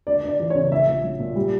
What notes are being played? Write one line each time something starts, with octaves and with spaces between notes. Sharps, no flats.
D2 D5
D2
D5
E3
C#5
C#3
A#1 E5
A#1
F#3
A#2
G3